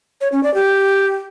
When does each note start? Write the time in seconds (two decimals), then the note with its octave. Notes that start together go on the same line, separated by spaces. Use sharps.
0.21 C#5
0.32 C#4
0.43 D5
0.54 G4